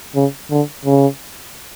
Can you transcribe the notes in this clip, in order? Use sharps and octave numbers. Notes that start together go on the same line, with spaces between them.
C#3
D3
C#3